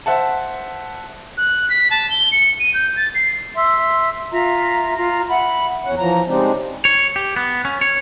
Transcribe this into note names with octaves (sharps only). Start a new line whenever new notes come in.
C5 E5 F#5 A5
F#6
B6
A5
G7
C#7
D#7
G6
A6
C7
E5 C6 E6
F4 E5 A#5
F4 A#5
E5 F#5 B5
E2 C#4 F#5
E3 F3 A#5
C#3 G3 G#3 C4 D4 D#4
C#5
G4
B3
C#4
C#5